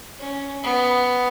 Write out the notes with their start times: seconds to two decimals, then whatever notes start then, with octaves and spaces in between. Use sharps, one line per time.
0.19 C#4
0.63 B3